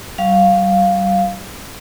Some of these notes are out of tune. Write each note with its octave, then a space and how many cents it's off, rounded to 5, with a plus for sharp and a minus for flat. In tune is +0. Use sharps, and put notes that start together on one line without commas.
G3 -40 F5 +0